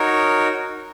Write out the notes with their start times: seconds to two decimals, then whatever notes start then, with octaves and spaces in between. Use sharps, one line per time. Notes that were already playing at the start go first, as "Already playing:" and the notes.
Already playing: D#4 F#4 A#4 C#5